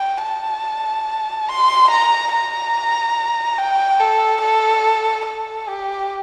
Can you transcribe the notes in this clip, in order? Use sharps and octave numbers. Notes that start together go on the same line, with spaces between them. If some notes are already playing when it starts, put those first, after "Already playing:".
Already playing: G5
A5
C6
A#5
A#5
G5
A4
A4
A4
G4